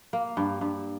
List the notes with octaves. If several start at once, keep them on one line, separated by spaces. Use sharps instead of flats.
A#3
G2
G2